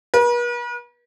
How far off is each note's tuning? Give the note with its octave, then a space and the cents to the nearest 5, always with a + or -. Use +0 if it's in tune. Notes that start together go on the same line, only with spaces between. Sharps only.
B4 -45